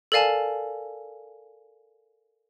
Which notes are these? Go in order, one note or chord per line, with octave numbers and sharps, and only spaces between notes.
A4 A#4 D5 F5 G#5 A5